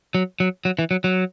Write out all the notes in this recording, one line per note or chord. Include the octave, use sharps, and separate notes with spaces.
F#3
F#3
F#3
E3
F#3
F#3